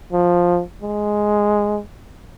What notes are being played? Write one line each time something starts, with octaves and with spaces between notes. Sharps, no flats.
F3
G#3